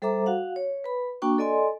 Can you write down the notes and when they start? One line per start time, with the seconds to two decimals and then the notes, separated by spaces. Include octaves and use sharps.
0.02 G3 A4 C5 E5 A#5 D6
0.26 F#4 F5 F#5
0.56 C#5
0.84 B4 B5
1.22 A#3 D4 F#4 G5 C#6
1.38 A4 D5 D#5 G#5 C6